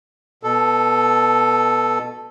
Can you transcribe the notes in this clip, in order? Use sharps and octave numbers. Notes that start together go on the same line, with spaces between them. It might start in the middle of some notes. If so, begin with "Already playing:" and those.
B2 A4